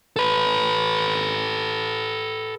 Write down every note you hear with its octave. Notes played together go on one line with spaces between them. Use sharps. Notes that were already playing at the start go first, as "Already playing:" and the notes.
A4 B4